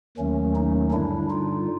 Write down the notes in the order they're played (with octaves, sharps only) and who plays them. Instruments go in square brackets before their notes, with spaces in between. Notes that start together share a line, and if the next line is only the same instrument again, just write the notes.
[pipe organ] D#2 D#3 F#3 A3 C#4
C#4 D#4
G2 D3 G3 D4 E4
D#4 F4